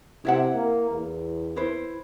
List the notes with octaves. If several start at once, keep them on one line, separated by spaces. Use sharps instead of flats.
C3 E4 E5 F#5
A#3
E2
E4 B4 C5